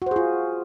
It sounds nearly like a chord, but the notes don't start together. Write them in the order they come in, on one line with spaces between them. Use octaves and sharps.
F#4 C5 G#4 F4